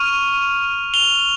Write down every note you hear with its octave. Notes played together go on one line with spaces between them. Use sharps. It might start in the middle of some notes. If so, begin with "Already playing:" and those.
Already playing: C#6 F6 D#7 F7
F7 G7